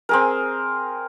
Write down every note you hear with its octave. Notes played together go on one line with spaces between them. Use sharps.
C4 G#4 A#4